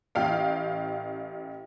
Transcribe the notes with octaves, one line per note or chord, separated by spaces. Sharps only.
A1 F5 G5